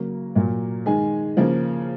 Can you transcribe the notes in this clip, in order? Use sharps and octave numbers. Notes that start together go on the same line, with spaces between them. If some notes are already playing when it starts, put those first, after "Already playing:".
Already playing: C#3 F#3 A#3 A#4
A#2 F#3 A#3
D#3 G#3 G#5
C#3 F3 A#3